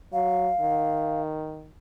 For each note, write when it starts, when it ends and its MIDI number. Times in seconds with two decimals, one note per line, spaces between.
0.13 0.51 54
0.13 1.22 77
0.60 1.70 51